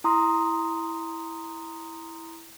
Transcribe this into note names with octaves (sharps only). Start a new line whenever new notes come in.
E4 A#5 C6 D#6